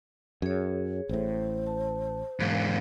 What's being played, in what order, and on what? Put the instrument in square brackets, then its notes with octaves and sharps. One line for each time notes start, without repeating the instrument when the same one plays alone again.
[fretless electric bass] F#2 [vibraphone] G#4 C#5
[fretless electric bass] A1 A2 [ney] C5
[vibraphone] A5
[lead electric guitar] E2 G#2 [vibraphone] A#4 F5